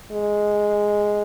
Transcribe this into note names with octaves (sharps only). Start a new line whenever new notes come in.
G#3